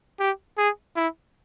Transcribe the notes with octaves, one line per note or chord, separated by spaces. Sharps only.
G4
G#4
E4